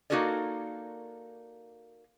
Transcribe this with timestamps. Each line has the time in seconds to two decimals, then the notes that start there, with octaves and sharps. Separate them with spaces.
0.10 A#3 D#4 F#4 A4 A#4 D5